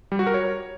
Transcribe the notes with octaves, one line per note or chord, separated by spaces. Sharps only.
G3
F#4
A#4
C#5